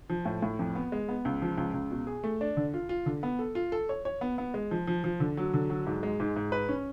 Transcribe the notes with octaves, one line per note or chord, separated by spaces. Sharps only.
F3
A2
A2
F2
B3
G#3
B3
C#2
F3
C#2
C#2
B2
G#4
A3
D4
D3
F4
F4
D3
B3
A4
F4
A4
C#5
C#5
B3
B3
G#3
F3
F3
F3
D3
F#3
D3
F#3
G#2
G#3
G#2
G#2
B4
C#4